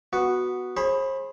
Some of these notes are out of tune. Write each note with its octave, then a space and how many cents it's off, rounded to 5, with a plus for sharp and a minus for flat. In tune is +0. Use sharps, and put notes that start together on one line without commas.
B3 +0 F#4 +0
G#4 +0 C5 +40 B5 +0